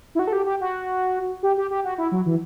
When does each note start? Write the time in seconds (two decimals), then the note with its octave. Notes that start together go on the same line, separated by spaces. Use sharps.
0.15 E4
0.19 F#4
0.28 A4
0.33 G4
0.46 G4
0.61 F#4
1.43 G4
1.57 G4
1.71 G4
1.84 F#4
1.98 E4
2.12 F#3
2.26 E3